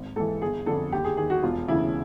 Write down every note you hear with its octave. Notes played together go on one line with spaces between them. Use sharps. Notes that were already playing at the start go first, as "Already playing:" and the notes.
Already playing: G#1
G#2 E3 A4
G1 G#4
F2 D3 A4
D#2 G4
G#4
D#3 G#4
F#4
E1 F4
D2 C#3 E3 E4